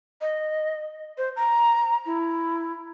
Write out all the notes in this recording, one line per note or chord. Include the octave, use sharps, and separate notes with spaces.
D#5
C5
A#5
E4